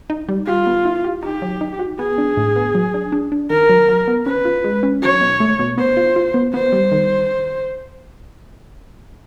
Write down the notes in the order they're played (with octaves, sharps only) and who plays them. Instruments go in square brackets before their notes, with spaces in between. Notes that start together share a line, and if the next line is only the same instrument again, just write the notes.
[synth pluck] D#4
G3
[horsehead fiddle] F4 [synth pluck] G4
[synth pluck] B3
E4
G4
[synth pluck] D#4 [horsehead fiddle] G4
[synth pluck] F#3
D#4
F#4
[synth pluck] B3 [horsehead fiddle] G#4
[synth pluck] D4
A2
B3
F#3
D4
D4
D4
[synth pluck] D#3 [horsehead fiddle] A#4
[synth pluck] F#3
F#3
B3
[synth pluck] C#4 [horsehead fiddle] B4
[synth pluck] F4
G#3
C#4
[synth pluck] F#3 [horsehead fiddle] C#5
[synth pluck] B2
A3
B2
[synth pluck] B3 [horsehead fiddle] C5
[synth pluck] F4
F4
B3
[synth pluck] B3 [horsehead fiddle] C5
[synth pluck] G3
D#3